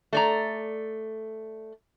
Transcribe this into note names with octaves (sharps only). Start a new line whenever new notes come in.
A3 D5 A#5